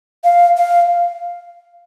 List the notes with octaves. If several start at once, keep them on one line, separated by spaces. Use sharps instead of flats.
F5
F5